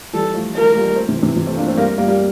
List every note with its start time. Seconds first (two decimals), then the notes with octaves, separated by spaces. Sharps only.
0.13 E3 G3 A4
0.34 F3 A3
0.54 F3 A3 A#4
0.74 G3 A#3
0.95 A3 C4
1.09 C3 E3
1.22 C3 E3
1.36 C3 E3
1.46 A3 C4
1.57 A#3 D4
1.67 A3 C4
1.77 G3 A#3 A#4
1.98 G3 A#3
2.08 G3 A#3